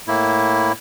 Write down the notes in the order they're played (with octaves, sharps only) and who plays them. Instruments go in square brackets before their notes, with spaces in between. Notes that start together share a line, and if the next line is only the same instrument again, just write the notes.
[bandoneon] A2 A#3 E4